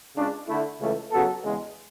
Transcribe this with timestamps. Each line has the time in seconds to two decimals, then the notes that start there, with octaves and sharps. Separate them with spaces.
0.16 C#2 C#3 G#3 D4
0.48 D3 A3 E4
0.80 C#2 C#3 E3 A3
1.12 C#3 F#3 B3 F#4 A4
1.43 E2 C#3 G#3